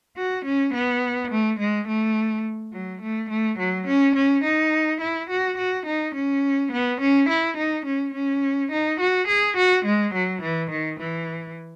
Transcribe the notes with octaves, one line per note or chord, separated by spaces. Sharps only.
F#4
C#4
B3
A3
G#3
A3
F#3
A3
A3
F#3
C#4
C#4
D#4
E4
F#4
F#4
D#4
C#4
B3
C#4
E4
D#4
C#4
C#4
D#4
F#4
G#4
F#4
G#3
F#3
E3
D#3
E3